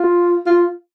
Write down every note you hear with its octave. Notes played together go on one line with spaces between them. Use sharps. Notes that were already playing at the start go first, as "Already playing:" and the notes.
Already playing: F4
F4